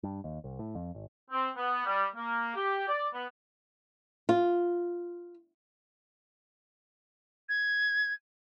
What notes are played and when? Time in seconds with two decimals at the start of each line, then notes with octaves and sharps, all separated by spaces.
0.03 G2
0.24 D#2
0.44 C2
0.59 A2
0.75 F2
0.95 G#1
1.31 C4
1.57 B3
1.86 G3
2.16 A#3
2.56 G4
2.89 D5
3.14 B3
4.29 F4
7.49 G#6